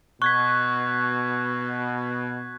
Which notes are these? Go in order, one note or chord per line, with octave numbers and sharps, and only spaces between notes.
B2 C#6 F#6 G#6 B6